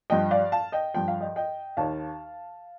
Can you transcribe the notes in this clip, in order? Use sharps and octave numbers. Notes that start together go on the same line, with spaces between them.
G2 F3 D#5 G5
D5 F5
F5 A5
D#5 G5
G2 F3 G5
F5
D#5 G5
D#5 G5
D#2 D#3 F5 A5